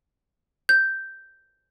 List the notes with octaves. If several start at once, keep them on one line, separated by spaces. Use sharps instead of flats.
G6